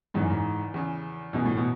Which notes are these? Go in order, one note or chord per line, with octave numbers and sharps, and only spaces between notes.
E2 G#2 C#3 E3
F#2
G#2
E2 C#3 E3
F#2 B2 E3 G#3
A2
B2